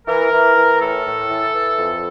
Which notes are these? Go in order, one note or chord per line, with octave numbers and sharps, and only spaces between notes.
E3 A#4
E3
E3
A2 A4
A2
E3
E3
F2